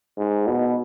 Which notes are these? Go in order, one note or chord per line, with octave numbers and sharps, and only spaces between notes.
G#2
B2